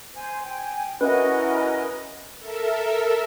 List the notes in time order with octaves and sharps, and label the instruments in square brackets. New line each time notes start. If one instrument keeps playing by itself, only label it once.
[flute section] C5 G#5
G5 G#5
[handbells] C#4 B4 [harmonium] E4 D#5 [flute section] F#4 A#4 G#5
[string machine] A4 A#4 E5